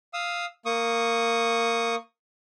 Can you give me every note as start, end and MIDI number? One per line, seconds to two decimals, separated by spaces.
0.14 0.45 77
0.14 0.45 87
0.14 0.45 88
0.66 1.95 58
0.66 1.95 85
0.66 1.95 87